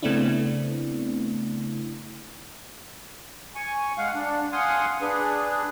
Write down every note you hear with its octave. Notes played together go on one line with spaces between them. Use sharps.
C#3 A3 B3 C4 D4 E4
G#5 C#6
G#3 F5 F#5
D4
F5 F#5 G#5 C6 D#6
D4 G#4 B4